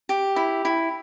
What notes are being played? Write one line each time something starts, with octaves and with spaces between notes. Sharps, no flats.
G4
E4
E4